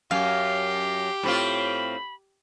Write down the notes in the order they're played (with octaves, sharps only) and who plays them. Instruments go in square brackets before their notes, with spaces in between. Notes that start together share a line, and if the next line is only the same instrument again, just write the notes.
[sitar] F#2 [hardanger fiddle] G4 [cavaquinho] F5 [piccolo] C7
[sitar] A2 C4 F4 [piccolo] B5